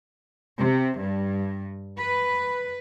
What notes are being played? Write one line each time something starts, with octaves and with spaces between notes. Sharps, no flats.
C3
G2
B4